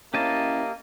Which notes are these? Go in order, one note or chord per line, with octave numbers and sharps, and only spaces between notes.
A#3 C#4 E4 G4 D#5 A5